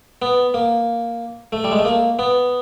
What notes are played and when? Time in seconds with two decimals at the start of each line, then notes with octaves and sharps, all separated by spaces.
0.22 B3
0.54 A#3
1.52 A3
1.64 G3
1.72 G#3
1.78 A3
1.85 A#3
2.19 B3